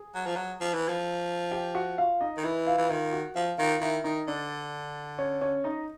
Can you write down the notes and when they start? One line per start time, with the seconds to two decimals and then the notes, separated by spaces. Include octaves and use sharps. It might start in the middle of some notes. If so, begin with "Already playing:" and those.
Already playing: G#4
0.14 F#3
0.26 F3
0.36 F#3
0.61 F3
0.74 E3
0.88 F3
1.52 G4 G5
1.75 F#4 F#5
1.98 F4 F5
2.21 D#4 D#5
2.37 D#3
2.44 E3 E4 E5
2.67 F4 F5
2.77 E3
2.89 D#3 F4 F5
3.13 F#4 F#5
3.35 F3 F4 F5
3.58 D#3 F4 F5
3.81 D#3 E4 E5
4.04 D#3 D#4 D#5
4.27 D3 D4 D5
5.18 C#4 C#5
5.41 C#4 C#5
5.64 D#4 D#5